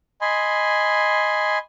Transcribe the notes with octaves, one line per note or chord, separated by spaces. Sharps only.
D#5 G#5 B5 C6